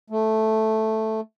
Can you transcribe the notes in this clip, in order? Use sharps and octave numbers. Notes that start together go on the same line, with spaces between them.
A3